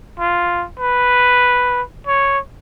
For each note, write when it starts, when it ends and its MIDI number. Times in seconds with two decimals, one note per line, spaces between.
0.20 0.65 65
0.80 1.82 71
2.07 2.39 73